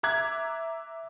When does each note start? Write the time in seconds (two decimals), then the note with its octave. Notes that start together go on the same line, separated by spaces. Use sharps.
0.03 E5 A#5 D6 F#6 G#6